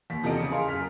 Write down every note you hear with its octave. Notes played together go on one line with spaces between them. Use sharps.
D#2 B6
E2 C3 F3 A4 D#5 D7
C#3 D#6 C#7
G#4 A#4 F5 C6
F#2 F6 B6